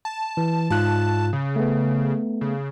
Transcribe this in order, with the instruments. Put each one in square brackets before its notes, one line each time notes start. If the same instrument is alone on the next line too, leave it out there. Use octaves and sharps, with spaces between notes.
[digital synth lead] A5
[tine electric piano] E3
[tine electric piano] G#2 F4 F#6 [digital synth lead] A5
[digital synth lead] C#3
[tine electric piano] A3 B3
[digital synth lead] C#3